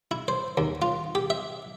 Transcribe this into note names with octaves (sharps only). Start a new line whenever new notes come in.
E4
C5
D#2
F4
G4
E5